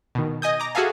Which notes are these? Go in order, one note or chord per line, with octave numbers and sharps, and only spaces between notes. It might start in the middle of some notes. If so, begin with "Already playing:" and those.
B2 D#3
D#5 G#5 D#6 G6
A#5 D6
F#4 G#4 A4 E5 F5 G#5